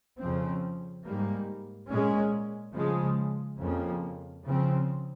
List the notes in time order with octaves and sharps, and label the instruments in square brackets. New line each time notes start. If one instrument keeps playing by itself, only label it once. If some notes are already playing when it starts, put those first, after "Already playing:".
[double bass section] F2 C#3 F3 C4
G#2 G3 A#3
A#2 G#3 C#4
C#3 F3 G#3
F2 C#3 F3 A#3
C#3 F3 C4